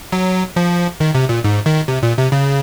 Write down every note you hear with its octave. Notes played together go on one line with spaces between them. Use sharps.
F#3
F3
D#3
C3
A#2
G#2
D#3
C3
A#2
C3
C#3